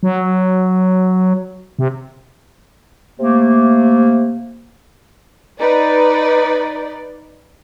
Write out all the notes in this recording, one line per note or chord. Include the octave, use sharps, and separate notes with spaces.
F#3
C3
C3 A3 A#3
D#4 B4 D5